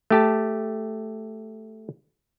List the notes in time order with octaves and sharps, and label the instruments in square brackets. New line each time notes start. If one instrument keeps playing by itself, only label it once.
[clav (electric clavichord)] A3 G4 A5